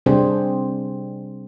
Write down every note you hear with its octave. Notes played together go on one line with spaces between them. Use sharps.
C3 G3 C4 D4 G#4 C5